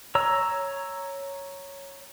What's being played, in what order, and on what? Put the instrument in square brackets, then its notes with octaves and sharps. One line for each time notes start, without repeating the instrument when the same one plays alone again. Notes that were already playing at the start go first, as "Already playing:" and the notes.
[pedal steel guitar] C#5 A#5 E6